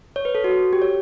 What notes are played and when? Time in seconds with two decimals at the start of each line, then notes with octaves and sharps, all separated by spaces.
0.16 C#5
0.25 B4
0.35 A4
0.44 F#4
0.73 G4
0.82 C#5